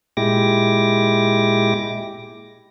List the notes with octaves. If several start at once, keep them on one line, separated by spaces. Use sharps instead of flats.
A#2 G#3 E4 G4 D6 A#6